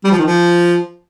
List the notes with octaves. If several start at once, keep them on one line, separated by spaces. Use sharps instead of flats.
G3
F3
D#3
F3